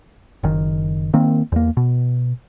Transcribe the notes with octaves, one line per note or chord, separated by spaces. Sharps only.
F#1 D#3
D#3 A#3 C4
E2 A#3
B2